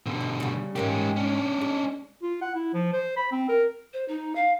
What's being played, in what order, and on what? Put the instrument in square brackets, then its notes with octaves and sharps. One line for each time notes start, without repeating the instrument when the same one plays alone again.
[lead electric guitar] B2 D3
[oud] D#4
C#3 G3
[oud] G#2 G#3 A#3 [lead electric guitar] C#4 G4
[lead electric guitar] C#4 D4
[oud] G#3
[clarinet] F4
F#5
E4
F3
C5
B5
C4
A#4
[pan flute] C5
D#4
F5